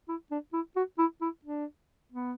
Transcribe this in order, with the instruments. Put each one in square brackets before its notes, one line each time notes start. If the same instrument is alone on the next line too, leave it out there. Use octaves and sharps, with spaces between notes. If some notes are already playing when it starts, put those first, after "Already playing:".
[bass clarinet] E4
D4
E4
F#4
E4
E4
D4
B3